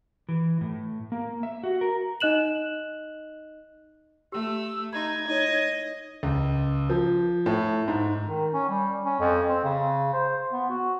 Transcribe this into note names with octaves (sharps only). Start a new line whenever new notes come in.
E3
A2
A#3
E5
F#4
A#4
D#4 D#5 F#6 E7 F#7
A3 G4 E6
D#4 B5 C6 G#6
D#4 E4 C#5 D#5
C#2
F3
A2
G#2
D#3
C#4
G3
C#4
F2
C4
C#3
C5
B3
F#4